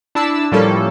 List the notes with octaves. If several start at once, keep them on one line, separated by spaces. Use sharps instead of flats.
D4 E4 A5 E6
A2 F3 G3 A#3 C#4 A4